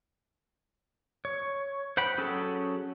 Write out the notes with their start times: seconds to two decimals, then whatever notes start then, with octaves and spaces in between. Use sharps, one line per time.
1.25 C#5
1.97 C5 F#5 G5 B5
2.18 F#3 C#4 G#4 A4